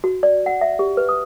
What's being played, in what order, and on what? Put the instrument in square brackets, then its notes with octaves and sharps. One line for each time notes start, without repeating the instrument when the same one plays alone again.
[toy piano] F#4
D5
F#5
E5
G4
B4
D#6